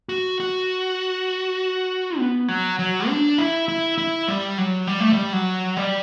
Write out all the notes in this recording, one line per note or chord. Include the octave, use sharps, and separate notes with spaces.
F#4
F#4
B3
F#3
F#3
D4
E4
E4
E4
G3
F#3
G3
A3
G3
F#3
G3